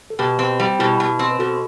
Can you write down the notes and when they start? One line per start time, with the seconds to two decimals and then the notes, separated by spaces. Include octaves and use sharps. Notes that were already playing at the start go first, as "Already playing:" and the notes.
0.10 A4
0.19 B2 G4 B4
0.39 C4
0.60 G3
0.79 B2 E4 G4
1.00 B2
1.19 C4
1.31 B4
1.39 B2 F#4 A4